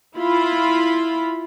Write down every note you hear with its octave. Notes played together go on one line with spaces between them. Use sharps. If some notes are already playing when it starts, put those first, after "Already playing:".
E4 F4 B5